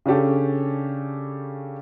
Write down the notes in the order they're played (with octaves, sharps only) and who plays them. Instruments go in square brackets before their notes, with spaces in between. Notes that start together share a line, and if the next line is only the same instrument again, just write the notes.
[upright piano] C#3 C#4 D4 G4 A4